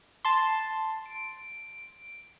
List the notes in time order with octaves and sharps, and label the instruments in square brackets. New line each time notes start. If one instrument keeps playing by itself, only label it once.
[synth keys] A5 C6
D7